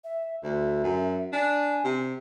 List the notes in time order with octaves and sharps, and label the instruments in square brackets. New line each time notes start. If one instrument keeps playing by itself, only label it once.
[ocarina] E5
[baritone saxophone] D2 [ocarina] E5
[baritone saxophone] F#2
[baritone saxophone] D4 [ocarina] G#5
[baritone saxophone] C3